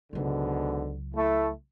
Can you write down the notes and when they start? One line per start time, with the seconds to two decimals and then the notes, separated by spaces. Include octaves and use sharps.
0.13 C#2 G#2 B2 D3 F#3
1.15 A3 E4